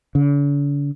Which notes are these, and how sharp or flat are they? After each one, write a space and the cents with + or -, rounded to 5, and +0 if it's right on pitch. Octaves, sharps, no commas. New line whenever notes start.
D3 -45